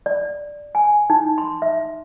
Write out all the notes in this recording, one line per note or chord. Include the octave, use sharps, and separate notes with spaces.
D5
G#5
D#4
C6
E5